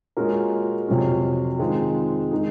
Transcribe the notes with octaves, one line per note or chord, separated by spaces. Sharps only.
A#2 G#3 C#4 F#4 A#4
F2 C3 F#3 C#4
D#3 G#3 C4 F4
D#3 G#3 D#4 G#4